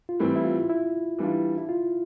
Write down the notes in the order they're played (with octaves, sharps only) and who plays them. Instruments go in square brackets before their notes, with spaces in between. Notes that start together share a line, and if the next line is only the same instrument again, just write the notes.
[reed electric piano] F4
[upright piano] A2 E3 G3 C4 [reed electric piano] E4
[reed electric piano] E4
F4
E4
[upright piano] E3 G3 D4 F4
[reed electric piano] E4
F4